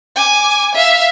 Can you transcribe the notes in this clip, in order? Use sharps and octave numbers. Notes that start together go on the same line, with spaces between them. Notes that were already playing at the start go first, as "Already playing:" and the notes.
G#5 D6
E5 F5